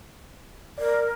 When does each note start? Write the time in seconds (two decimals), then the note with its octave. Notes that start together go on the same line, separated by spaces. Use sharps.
0.78 A#4 D5